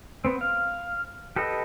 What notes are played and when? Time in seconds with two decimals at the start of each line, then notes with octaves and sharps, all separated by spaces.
0.25 B3 C4
0.41 F5
1.36 G4 A4 B4 D#5